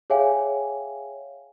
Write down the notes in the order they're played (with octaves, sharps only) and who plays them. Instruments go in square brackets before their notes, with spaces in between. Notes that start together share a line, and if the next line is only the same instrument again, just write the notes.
[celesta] G#4 C#5 E5 F5 G5 G#5